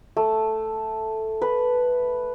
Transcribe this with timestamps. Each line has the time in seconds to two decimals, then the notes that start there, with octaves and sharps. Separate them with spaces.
0.17 A3
1.42 B4